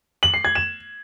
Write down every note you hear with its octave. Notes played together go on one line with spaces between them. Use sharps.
F#7
C7
G#6
E7